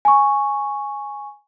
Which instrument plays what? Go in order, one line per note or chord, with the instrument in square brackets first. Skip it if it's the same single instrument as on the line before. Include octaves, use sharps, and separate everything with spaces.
[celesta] G#5 C#6